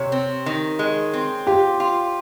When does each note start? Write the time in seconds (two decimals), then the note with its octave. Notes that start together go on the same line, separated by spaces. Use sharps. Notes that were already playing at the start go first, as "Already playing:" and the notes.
Already playing: C3 C#5
0.12 C4
0.46 D#3
0.79 G#3
1.13 C4
1.47 F4 G4
1.80 F4